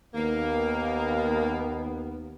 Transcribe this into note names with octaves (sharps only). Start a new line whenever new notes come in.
D#2 A#3 B3